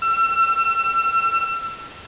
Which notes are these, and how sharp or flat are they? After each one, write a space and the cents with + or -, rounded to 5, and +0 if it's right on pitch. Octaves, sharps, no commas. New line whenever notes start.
E6 +35